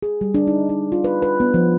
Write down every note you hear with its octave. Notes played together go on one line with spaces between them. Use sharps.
G#4
G3
D4
D#4
D#4
F4
B4
B4
B3
F3